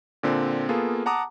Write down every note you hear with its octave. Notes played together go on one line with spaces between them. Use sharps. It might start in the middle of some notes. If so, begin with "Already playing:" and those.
A#2 D3 C4
A#3 B3 F4 G#4 A4
F#5 A5 A#5 D6 D#6